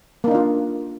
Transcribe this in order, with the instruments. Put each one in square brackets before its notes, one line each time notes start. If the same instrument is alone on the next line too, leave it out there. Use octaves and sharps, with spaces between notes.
[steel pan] A#3
D#4
D4
F4